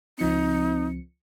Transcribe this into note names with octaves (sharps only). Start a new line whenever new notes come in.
C#2 F3 C4 D#4 C#7